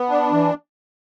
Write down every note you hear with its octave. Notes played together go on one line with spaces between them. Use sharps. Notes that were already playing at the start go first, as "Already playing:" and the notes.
Already playing: B3
D4
E3